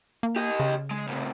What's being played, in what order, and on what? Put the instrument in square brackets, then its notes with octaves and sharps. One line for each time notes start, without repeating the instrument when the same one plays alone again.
[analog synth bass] A#3
[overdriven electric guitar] G4 D#5
[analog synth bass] C#3
[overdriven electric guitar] G#3
A2 C3